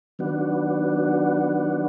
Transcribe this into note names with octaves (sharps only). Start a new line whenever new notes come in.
D#3 F#3 B3 D4 F#4